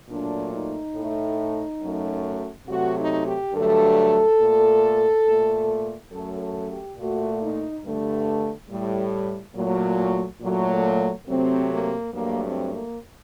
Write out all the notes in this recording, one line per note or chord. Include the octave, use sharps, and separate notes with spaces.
A#2 F#3 A3 D4
D#4
A2 A3
F#2 F#3 A3
C3 F#3 A3 F#4
D#4
G4
G2 D3 F#3 A3 A4
A#2 A3
A#2 A3
F#2 F#3 A3 A4
A4
G4
A#2 A3 F#4
D#4
G2 D3 A3
A2 G3
A#2 F#3 A3
A#2 F#3 A3
C3 F#3 A3 C4
A#3
G2 F#3 A3 A#3
C4
A#3